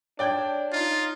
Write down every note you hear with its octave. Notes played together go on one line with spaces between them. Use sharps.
D4 C#5 D5 G5 G6 G#6
D#4 F4